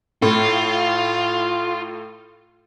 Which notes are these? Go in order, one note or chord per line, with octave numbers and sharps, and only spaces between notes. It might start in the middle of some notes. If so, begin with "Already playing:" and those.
A2 F4